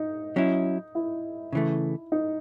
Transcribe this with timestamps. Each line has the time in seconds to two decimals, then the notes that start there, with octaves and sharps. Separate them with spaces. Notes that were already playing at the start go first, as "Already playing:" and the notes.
Already playing: D#4
0.36 F#3 C#4 E4
0.95 E4
1.53 C#3 E3 A3
2.12 D#4